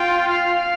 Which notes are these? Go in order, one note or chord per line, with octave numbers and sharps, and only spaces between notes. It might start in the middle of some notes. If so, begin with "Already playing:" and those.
Already playing: F4 G5
F5